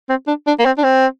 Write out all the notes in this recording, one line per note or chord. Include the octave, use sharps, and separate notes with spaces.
C4
D4
D4
A#3
C4
D4
C4